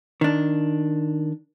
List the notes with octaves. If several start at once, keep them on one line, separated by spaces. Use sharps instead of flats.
D#3 D4